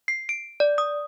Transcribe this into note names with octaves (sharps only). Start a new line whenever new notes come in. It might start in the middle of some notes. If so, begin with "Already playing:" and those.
C7
D7
D5
D#6